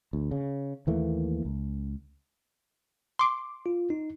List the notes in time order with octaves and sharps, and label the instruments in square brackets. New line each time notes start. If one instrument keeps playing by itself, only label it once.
[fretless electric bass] D2
C#3
D#2 E3 A3 A#3
C#2
[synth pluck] C6 D6
[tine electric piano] F4
D#4